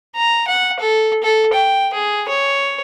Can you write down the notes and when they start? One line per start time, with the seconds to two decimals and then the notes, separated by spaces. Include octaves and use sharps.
0.16 A#5
0.48 F#5
0.80 A4
1.23 A4
1.53 G5
1.94 G#4
2.29 C#5